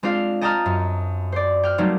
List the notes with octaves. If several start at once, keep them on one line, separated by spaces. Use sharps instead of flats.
G#3 C4 D4 F4 F5
D#5 G5 A5 A#5 D#6 F6
F#2
C5 D5
G5 F6 F#6
F#3 G3 A3 A#3 C4 D#4